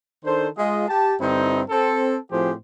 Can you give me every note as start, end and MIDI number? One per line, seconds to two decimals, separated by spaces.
0.25 0.47 51
0.25 0.47 62
0.25 0.47 69
0.25 0.47 72
0.57 0.87 56
0.57 0.87 65
0.57 0.87 75
0.88 1.15 67
0.88 1.15 81
1.20 1.62 43
1.20 1.62 50
1.20 1.62 60
1.20 1.62 63
1.20 1.62 64
1.70 2.17 60
1.70 2.17 69
2.32 2.53 45
2.32 2.53 53
2.32 2.53 60
2.32 2.53 67
2.32 2.53 68
2.32 2.53 72